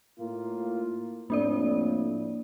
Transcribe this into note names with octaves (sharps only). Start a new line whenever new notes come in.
A2 A#3 F4
F2 A2 A#3 D4 D5